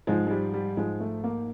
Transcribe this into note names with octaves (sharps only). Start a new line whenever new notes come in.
G#2 F3 G#3
G#3
G3
G3
G#2 F3 G#3
A3
A#3